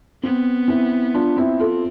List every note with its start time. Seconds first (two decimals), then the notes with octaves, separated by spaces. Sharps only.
0.23 B3 C4
0.68 C4 E4
1.14 D4 F4
1.37 C4 E4
1.59 C4 F4 A4